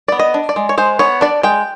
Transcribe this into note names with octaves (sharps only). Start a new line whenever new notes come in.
B3 D5
D#5
D4
D5
G#3
C#5
G#3 C5
B3 C#5
D4 D5
G#3 G5